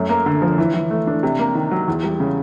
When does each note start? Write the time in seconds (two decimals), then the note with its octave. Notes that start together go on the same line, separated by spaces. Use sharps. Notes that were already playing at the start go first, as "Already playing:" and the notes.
Already playing: F#2 A3
0.09 A#3
0.26 D3
0.42 F3
0.58 E3
0.74 E3
0.91 A3
1.07 D4
1.23 C3
1.39 A#3
1.55 D#3
1.71 F#3
1.88 E2
2.04 G3
2.20 C#3